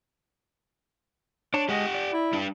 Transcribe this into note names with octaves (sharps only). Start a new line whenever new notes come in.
D4 C#5 D5 A5
G#3 G4 D#5 F#5
D5
E4
G3 D4